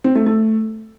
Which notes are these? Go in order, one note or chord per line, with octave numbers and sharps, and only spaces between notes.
C4
A3
A3